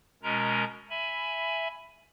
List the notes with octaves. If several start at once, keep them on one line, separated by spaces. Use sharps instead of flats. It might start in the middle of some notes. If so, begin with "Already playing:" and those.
B2 G#3 C#4 A#4 A#5
E5 G#5 B5